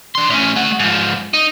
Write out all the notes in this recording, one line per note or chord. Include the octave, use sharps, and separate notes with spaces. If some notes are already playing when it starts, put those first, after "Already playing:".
D4 C6
A2 C#4
A3 F#5
G#2 F3
D#4